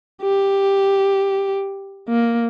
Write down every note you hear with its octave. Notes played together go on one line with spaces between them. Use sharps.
G4
A#3